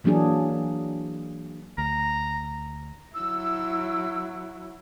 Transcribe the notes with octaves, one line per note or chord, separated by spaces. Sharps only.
E3 F#3 A#3 D4 G#4
D2 A#5
F#3 E4 E6